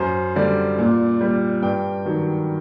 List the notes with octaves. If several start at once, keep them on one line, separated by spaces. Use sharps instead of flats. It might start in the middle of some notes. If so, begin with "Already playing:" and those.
Already playing: F#2 C5
D3 G3 D5
A#2
G3
G2 G5
D#3 F#3